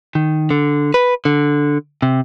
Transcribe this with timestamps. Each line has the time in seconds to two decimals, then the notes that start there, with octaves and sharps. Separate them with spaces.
0.15 D#3
0.51 D3
0.94 B4
1.25 D3
2.02 C3